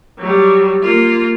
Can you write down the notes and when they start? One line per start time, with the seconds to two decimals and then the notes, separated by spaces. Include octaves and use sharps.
0.19 F#3 G3
0.83 A#3 F4